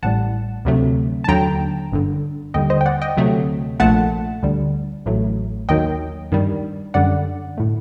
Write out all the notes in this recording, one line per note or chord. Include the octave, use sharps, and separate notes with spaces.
A1 A2 G3 F#5 A5
D2 C3 F#3 A3
A5
D#2 D3 F#3 G5 A#5
G1 G2 D3
D#2 D3 G3 D#5 G5
C5 D#5
G5
D5 F#5
D#5 G5
D2 C3 F#3 A3
A#1 A#2 A3 F#5 A5
D2 D3 G3
A1 A2 F#3 A3
D#2 D#3 F#3 D#5 G5
G2 D#3 G3
F#2 D3 G3 D5 F#5
A2 A3